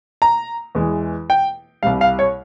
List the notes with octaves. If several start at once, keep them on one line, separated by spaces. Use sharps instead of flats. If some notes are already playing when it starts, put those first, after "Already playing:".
A#5
E2 E3 G#3
G5
C2 C3 G3 F5
F5
C#5